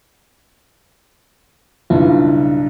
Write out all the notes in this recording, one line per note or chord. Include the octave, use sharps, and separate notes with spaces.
B1 G2 C#3 D4 E4 F4